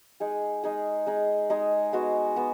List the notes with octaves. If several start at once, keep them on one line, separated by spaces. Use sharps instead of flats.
G#3 D#4 G#4
G#3 D#4 G#4
G#3 D#4 G#4
G#3 D#4 G#4
G#3 B3 F#4
B3 F#4